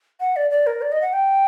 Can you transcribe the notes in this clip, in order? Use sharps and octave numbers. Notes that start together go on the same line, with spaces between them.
F#5
D5
D5
A#4
D5
D#5
F#5
G5